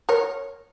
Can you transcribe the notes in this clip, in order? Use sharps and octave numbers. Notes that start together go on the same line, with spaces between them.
A#4 C#5